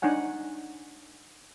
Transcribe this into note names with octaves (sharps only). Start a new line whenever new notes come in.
D4 D#4 C#5 F#5 G#5